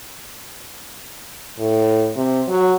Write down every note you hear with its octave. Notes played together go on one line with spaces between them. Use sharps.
A2
C3
F#3